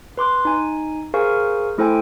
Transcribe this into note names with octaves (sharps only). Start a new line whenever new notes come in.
B4 C6 D6 F#6
D#4 G#5
G#4 A#4 C5 F5 G#5 C#6
A3 E4 A4 C5 G5 G#5